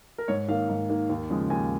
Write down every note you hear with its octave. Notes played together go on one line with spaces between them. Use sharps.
A#4
G#2 C#5
D#3 A#3 F5
G#2
D#3 A#3
D#2
C#3 F3 G#3
D#2 G#5